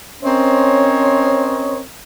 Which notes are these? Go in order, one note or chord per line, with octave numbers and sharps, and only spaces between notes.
C4 C#4 A#4 C5 C#5 D#5